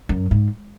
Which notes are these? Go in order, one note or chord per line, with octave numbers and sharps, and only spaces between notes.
F#2
G#2